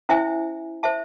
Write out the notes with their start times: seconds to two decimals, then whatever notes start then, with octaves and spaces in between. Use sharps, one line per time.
0.09 C#4 E4 C5 E5 G#5
0.83 C5 E5 A5